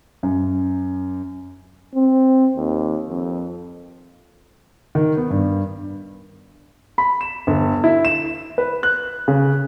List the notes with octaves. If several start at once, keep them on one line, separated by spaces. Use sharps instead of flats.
F#2
C4
D#2
F2
D#3
B3
G2
B5
E7
G1
E4
E7
B4
F#6
C#3